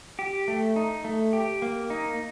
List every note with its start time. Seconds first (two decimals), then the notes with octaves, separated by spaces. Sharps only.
0.19 G4
0.48 A3
0.76 D#4
1.05 A3
1.33 G4
1.62 A#3
1.90 D#4